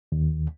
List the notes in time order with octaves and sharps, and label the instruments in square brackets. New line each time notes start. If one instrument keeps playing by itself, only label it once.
[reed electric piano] D#2